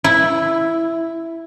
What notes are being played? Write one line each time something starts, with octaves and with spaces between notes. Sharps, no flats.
E4